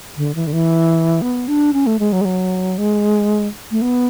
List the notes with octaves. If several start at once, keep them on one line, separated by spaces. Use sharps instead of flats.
D3
E3
D3
E3
B3
D4
C#4
A3
G#3
F#3
G#3
F#3
G#3
A3
B3